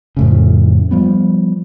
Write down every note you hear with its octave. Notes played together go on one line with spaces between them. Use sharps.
F2 A2 C#3
F3 G3 B3